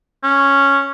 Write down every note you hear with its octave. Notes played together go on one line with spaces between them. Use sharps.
C#4